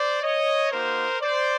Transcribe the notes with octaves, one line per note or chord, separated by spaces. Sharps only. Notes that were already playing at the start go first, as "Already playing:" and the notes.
Already playing: C5 D5
C#5 D#5
A#3 D#4 F#4 A#4 C5
C5 D5